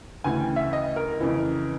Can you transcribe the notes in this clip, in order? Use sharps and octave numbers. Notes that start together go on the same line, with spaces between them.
D2 C#3 E3 G#5
G5
E5
D#5
A#4
F2 C#3 E3